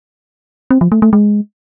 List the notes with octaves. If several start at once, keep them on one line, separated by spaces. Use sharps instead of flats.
C4
F3
A3
A3
G#3